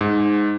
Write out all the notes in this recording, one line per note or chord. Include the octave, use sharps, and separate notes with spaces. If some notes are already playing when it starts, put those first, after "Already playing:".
G#2